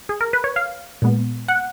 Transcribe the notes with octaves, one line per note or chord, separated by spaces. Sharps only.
G#4
A#4
B4
C#5
F5
A#2 G#3 B3
F#5